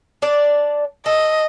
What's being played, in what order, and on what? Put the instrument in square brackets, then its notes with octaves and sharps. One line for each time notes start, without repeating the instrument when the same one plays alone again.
[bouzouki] D4 D5
[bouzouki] A4 [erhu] D#5